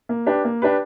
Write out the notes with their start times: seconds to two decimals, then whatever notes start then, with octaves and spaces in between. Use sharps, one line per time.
0.09 A#3
0.26 D4 G4 B4
0.45 A#3
0.62 D4 G4 B4